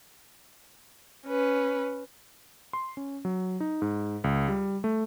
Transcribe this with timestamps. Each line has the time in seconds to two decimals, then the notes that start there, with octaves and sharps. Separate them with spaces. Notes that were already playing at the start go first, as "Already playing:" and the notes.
1.27 C#4 B4
2.73 C6
2.97 C#4
3.25 F#3
3.60 D#4
3.82 G#2
4.24 C#2
4.48 G3
4.84 A3